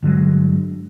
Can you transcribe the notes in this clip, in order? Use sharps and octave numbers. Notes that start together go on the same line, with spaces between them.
G1 D3 F#3 G#3